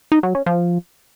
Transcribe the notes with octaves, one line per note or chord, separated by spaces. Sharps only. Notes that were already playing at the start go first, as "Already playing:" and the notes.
D#4
F#3
C#4
F3